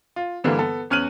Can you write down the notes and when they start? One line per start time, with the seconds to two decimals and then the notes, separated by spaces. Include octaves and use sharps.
0.16 F4
0.44 G2 D3 E3 G3 A#3
0.58 B3 A4
0.90 E2 C#4 F6 F#6 D#7 F#7